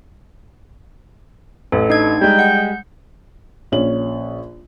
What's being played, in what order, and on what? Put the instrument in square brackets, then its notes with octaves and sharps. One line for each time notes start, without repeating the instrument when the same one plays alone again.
[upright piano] A1 [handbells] A4
[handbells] D4 G#6 [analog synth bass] D#4
[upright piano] G3 G#3 [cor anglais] G5
[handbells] F#5 G6
[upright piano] A#1 C#4 F#7